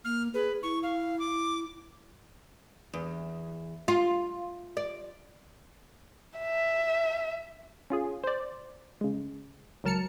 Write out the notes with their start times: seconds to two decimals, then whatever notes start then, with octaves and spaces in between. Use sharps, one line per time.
0.05 A#3 F6
0.34 G#4 B4
0.63 E4 C#6
0.83 F5
1.19 D6
2.94 E2
3.88 F4
4.77 D5
6.39 E5
7.90 C#4 F4 G#4
8.24 C5 D5
9.01 C#3 G#3
9.84 C#2 F#3 A#4 A5 F6 C#7